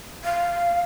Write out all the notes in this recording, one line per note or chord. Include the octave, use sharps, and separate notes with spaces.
F5